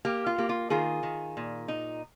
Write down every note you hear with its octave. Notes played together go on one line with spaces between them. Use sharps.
A#3 G4
F4
A#3 G4
F4
D#3 F4 G#4
D#3
A#2
D#4